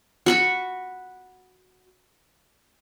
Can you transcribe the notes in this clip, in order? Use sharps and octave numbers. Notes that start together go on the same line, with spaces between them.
F#4 B5 C#6